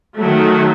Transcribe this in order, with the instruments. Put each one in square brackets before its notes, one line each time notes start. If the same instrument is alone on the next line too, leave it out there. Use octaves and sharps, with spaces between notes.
[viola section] D#3 F#3 A3